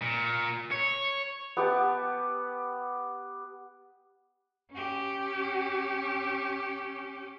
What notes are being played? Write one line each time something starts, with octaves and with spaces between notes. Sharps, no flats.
A#2
C#5
B3 G4 F#5 A5
C#4 G4